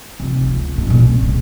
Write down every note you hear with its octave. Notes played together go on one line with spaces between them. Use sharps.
F1
C#2
F2 G#2
G2 A#2
C2
C#3